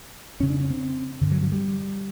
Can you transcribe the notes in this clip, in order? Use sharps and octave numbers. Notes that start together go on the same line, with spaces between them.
F2 C#3 C#4
D4
C#4
C4
G2 D3
F#3
F#3
G3